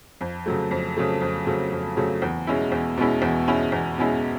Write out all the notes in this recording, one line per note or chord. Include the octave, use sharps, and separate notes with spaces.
F2
C#3 F#3 A3
F2
C#3 F#3 A3
F2
C#3 F#3 A3
F2
C#3 F#3 A3
E2
B2 G#3 C#4 E4
E2
B2 G#3 C#4 E4
E2
B2 G#3 C#4 E4
E2
B2 G#3 C#4 E4